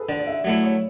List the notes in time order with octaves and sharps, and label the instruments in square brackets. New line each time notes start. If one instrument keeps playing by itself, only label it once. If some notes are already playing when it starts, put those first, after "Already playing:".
Already playing: [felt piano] G#4 A4 B4
[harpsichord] D3 [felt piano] D5
[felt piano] D5
E5
[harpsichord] F#3 A3 E4 [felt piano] D5
[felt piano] C#5